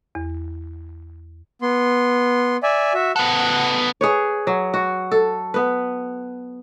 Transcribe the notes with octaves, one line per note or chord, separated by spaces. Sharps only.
E2
B3 C6
D5 E5 G#5
F#4 E5
B3 A4 F#5 F#6
G#4 B4 C#5
F#3
F#4
A4
B3 B4